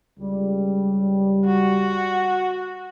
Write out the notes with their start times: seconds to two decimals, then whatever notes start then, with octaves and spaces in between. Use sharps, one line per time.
0.19 C#2 G3
1.46 F#4